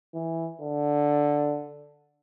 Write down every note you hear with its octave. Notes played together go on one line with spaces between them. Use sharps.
E3
D3